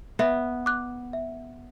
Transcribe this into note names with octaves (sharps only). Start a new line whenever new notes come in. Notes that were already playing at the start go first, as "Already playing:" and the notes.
B3 E5
D6 F#6
E5